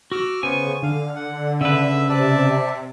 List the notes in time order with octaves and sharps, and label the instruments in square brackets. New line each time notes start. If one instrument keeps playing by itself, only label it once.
[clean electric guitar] F#4 [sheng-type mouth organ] D6 E6 F6
[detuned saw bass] C#3 [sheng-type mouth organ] B3 C5 C#6 [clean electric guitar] G#5
[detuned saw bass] D3 [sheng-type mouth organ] F5
[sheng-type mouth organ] F#5
[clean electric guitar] C#3 B4 [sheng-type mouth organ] E5 E6
[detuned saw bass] C3 [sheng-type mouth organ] D5 E5 A5